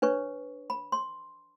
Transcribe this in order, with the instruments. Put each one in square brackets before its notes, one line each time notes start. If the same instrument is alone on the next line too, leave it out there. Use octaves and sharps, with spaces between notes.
[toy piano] D4 B4 C#5 C#6
B5
C6